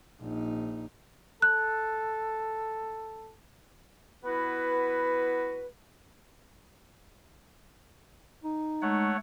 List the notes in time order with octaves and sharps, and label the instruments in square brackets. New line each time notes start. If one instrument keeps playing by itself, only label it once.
[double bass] A#1 D#4
[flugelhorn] A4 [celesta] F#6
[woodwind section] B3 E4 F#4 B4
[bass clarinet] D#4
[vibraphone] G#3 [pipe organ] A3 C#5 F#5